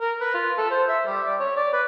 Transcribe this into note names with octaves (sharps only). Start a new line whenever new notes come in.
A#4
B4
F4
A4
C5
E5
G3
D5
C#5
D5
B4